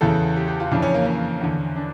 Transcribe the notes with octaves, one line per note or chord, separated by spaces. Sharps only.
E2 C#3 E3 A4
G4
G4
F4
F2 C#3 E3 D4
C#4
A#3
C#4
E2 D3
D4